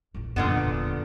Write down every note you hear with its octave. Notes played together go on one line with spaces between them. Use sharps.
A#1 A2
A1 F#2 A#2 D3 B3
E1 D2